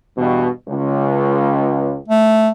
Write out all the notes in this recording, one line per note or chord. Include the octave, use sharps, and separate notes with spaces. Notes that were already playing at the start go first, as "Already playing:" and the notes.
E2 G2 B2
C#2
A3